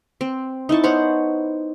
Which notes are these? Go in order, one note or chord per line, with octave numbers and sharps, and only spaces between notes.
C4
D#4 E4 A5 C#6
B3 C5 C#5 F#5